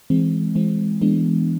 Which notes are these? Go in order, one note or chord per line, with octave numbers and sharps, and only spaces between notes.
E3 G#3 C4
E3 G#3 C4
E3 G#3 B3 D4